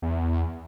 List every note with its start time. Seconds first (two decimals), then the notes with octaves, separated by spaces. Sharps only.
0.02 E2